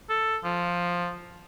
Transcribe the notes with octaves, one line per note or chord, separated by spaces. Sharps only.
A4
F3